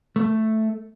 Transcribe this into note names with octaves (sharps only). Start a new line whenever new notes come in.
A3